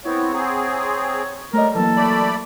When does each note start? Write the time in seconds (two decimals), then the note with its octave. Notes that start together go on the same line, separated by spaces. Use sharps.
0.05 B3 C4 E4 C#5
0.33 C4 G#4 F#5 A#5
1.53 G3 A3 A#4 C#5 D#5
1.75 E3 F#3 A#3 A4
1.96 A3 D5 B5